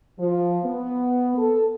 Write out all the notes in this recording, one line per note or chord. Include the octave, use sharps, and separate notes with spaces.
F3
B3
A4